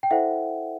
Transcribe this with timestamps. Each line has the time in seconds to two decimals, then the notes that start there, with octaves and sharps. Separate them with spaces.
0.03 G5
0.11 E4 A4 C5 E5 F#5